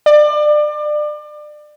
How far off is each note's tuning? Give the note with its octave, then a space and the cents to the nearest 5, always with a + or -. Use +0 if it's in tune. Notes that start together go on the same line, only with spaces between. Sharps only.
D5 +30